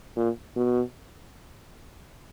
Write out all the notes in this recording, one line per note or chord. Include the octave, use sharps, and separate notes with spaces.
A#2
B2